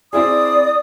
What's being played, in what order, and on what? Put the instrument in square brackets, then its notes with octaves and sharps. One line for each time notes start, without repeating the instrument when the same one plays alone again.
[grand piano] C4 E4 G#4 [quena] D5 [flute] D#6